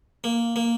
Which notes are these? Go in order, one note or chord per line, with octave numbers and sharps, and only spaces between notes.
A#3
A#3